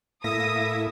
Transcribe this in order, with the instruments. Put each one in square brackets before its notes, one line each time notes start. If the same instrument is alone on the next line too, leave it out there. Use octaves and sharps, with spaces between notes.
[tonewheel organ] A2 A#3 A4 [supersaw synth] E4 E5 [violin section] D#6 [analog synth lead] A#6